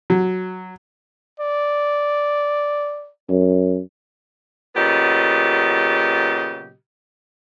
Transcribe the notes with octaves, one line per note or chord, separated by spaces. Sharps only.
F#3
D5
F#2
A#2 C#3 F#3 B3 G4 D#5